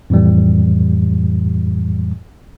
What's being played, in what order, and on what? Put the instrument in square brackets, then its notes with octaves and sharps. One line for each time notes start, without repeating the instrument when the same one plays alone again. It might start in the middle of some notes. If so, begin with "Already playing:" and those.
[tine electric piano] F2 A2 E3 G3